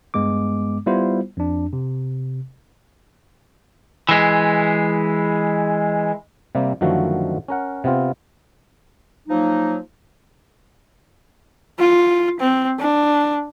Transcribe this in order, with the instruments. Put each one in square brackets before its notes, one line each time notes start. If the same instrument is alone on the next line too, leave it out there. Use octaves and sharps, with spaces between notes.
[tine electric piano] G2 G#3 B3 D6
G3 B3 E4 F4 C5
F2 D4
C3
[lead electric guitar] E3 G#3
[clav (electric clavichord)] C3 G3 A#3 C4
F#2 D3 D#3 F3 A3 F#4
C#4 A#4 F#5
C3 B3 C4 F4
[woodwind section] F3 F#3 A#3 D#4
[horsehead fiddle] F4
C4
D4